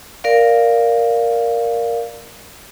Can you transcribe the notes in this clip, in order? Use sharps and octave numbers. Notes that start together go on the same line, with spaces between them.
A#4 D5 F5